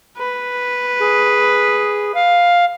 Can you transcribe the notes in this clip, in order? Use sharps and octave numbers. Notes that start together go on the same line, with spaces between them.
B4
G#4
F5